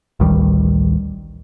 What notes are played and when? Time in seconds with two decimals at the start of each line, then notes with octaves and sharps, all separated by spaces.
0.20 A1 D2 D#3 G3